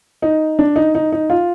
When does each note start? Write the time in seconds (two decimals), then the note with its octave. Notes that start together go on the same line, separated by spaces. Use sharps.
0.22 D#4
0.59 D4
0.76 D#4
0.95 D#4
1.12 D#4
1.30 F4